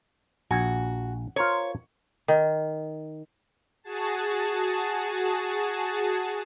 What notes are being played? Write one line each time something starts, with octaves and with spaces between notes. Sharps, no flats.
A#1 F#4 G#5
F4 A#4 C5 C#5
D#3
F#4 G#4 A5